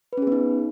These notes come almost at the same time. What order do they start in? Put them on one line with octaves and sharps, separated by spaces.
B4 C#4 G#4 B3 D#4